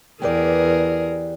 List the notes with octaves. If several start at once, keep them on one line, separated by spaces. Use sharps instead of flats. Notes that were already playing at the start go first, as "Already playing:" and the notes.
E2 G4 G#4 A#4 B4 D5